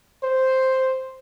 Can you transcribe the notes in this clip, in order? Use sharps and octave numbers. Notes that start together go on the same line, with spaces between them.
C5